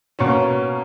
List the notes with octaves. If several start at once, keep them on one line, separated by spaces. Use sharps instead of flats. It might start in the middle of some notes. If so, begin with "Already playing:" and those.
B2 A#3 C#4